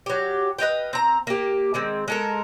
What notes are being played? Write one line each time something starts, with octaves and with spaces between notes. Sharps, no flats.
F#3 G4
B4 D#5 F5 G5
C4 A#5
A#3 G4
D#3 G#3 C4
G#3 A4 A#4